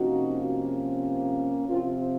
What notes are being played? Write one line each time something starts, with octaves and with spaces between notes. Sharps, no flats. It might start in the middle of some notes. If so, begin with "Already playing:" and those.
Already playing: C3 F3 A#3 C#4 D#4 F#4
C3 F3 C4 C#4 F4